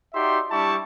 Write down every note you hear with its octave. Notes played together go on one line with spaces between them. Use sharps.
D#4 F#4 G4 D5 E5 C6
G3 D4 E4 G4 A5 C#6